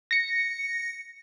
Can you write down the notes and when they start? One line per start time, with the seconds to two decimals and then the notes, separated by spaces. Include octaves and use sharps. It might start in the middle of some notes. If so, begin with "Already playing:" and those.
0.11 A#6 C#7